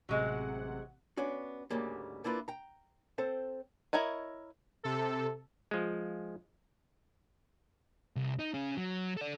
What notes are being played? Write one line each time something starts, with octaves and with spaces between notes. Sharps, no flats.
A1 C3 F#3 G#3 F#5
B3 C#4 D4 F#4
D2 G#2 C#3 G3 A#3
A#3 D4 E4 F4 G4 B4
G5 A#5
C4 A4 C5
E4 A#4 C#5 D#5
C3 A4
F3 G#3
C2
D#4
C#4 G#4
F#3
A4 D5